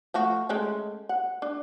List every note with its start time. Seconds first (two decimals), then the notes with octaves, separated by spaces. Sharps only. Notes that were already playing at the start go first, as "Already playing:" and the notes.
0.14 F3 A3 F#4
0.49 G#3 A3 C#4
1.09 F#5
1.42 D4